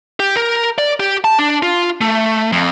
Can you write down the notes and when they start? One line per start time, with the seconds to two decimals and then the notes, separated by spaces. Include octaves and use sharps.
0.20 G4
0.36 A#4
0.78 D5
1.00 G4
1.24 A5
1.39 D4
1.63 F4
2.01 A3
2.52 F2